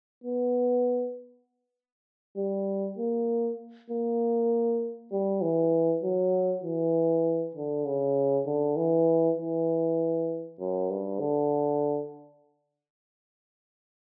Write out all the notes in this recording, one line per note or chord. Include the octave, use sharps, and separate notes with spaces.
B3
G3
A#3
A#3
G3
E3
F#3
E3
D3
C#3
D3
E3
E3
F#2
G2
D3